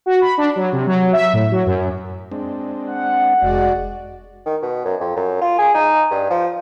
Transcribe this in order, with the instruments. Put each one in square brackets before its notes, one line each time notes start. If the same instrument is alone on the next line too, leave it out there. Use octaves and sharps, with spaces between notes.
[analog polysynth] F#4
B5
D4
F#3
C3
F#3
E5
A2
F#3
F#2
[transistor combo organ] G#3 C4 D4
[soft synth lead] F#5
[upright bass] F1 [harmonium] G#3 F#4 D5
[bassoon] D#3
B2
F#2
F2
F#2
F4
G#4
D#4
G2
F3